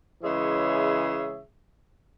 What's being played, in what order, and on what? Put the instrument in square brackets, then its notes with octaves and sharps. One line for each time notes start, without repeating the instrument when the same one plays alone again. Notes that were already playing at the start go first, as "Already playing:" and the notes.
[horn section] C#3 E3 G#3 G#4 C#5 E5